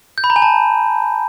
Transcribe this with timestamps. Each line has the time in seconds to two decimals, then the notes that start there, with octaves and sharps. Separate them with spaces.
0.18 G6
0.24 B5
0.30 A#5
0.36 G#5
0.42 A5